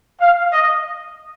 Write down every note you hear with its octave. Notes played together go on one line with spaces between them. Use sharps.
F5
D#5